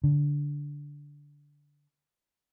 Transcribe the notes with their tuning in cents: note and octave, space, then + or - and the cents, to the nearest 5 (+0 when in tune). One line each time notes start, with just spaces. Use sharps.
D3 -15